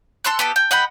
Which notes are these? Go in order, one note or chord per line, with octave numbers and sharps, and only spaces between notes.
A4 C6 E6 F#6
B3 G4 A4
G5
D#5 F#5 G5 B5